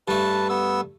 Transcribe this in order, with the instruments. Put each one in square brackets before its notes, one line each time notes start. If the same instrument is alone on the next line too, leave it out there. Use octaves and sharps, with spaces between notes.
[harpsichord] G2 A3 [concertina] B4 A5
[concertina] B3 E6